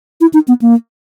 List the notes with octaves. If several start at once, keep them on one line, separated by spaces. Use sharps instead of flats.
E4
D#4
B3
A#3